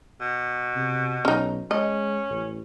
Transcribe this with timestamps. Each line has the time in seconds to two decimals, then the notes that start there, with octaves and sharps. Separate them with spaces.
0.21 B2
0.75 C3
1.25 B1 C#4 D#4
1.71 G#3 C#4 D#5
2.30 A1